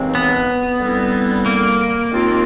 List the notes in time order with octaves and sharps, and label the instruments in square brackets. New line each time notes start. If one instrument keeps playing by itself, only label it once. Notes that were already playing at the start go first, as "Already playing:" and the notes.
Already playing: [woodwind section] D#2 C#3 E3 G#3 C4
[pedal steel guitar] B3
[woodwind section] D3 G3 C4 E4
[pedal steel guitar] A#3
[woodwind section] D#2 D#3 G#3 C4 F4